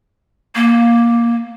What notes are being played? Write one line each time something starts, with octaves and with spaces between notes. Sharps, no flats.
A#3